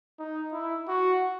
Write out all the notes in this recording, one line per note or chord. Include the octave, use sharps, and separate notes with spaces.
D#4
E4
F#4